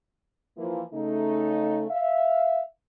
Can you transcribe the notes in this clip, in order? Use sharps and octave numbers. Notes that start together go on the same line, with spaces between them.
E3 F3 A#3
C#3 A3 D#4
E5 F5